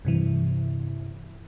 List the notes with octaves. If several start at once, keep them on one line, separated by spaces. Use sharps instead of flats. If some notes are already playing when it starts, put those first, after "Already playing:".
G2 C3 E3